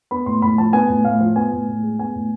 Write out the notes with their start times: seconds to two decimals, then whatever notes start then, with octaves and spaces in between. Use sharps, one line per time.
0.11 B3 B5
0.26 A2 C6
0.42 A2 B5
0.58 F3 A5
0.73 B3 G#5
0.89 A2
1.04 A2 F5
1.20 F3
1.36 B3 G#5
1.52 A2
1.68 A2
1.83 G#3
1.99 B3 G#5
2.15 A2